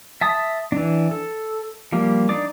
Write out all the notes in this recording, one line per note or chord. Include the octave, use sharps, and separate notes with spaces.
E5 A5 D#6
E3 D4
A4
F3 G3 A#3
D4 D#4 D5 D6